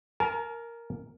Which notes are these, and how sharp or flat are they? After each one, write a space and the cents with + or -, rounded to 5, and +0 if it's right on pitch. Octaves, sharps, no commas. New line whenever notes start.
A#4 +0 A5 -45